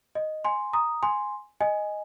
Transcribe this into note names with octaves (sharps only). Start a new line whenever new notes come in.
D#5
G#5 C6
A#5 D#6
G#5 C6
D#5 G#5